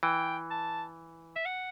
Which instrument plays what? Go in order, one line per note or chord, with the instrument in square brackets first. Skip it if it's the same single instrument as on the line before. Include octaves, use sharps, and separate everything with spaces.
[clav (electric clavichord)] E3 [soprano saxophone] G5
[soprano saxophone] A5
E5
F#5